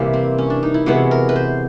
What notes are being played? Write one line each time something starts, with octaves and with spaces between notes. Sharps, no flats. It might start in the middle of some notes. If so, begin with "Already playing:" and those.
Already playing: C3 E3 G3 A#3
C4
C#4
D4
D#4
E4
C3 E3 G#3 B3 F#4
A#4
B4
C5